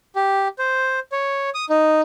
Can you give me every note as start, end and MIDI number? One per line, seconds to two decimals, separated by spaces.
0.16 0.48 67
0.59 0.99 72
1.12 1.50 73
1.54 1.65 87
1.70 2.01 63